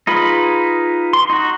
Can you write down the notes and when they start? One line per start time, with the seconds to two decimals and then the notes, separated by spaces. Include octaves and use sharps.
0.07 D#4 F4 G#4 B4 B5
1.13 C6
1.30 D#4 F#4